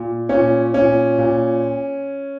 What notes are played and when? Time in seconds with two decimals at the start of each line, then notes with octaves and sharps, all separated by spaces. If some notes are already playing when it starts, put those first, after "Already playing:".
Already playing: A#2
0.29 A#2 C#4
0.74 A#2 C#4
1.18 A#2